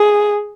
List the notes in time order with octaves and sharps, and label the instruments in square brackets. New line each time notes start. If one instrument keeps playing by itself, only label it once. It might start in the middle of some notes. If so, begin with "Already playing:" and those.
Already playing: [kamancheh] G#4